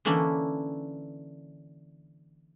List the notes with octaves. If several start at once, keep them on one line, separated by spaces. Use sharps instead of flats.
D3 E3 A#3 C#4 D4 E4